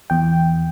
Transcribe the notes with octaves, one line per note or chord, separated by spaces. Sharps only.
E2 G5